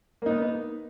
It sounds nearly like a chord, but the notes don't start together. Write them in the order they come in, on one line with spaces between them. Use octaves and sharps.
A#3 D#4 B3